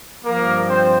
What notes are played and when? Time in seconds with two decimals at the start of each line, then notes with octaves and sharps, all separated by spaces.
0.24 G2 F3 A#3 A#4
0.68 C4 C5